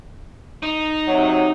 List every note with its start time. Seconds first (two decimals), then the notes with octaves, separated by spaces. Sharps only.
0.63 D#4
1.07 C3 F#3